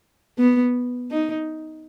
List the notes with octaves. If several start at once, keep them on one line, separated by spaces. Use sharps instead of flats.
B3
D#4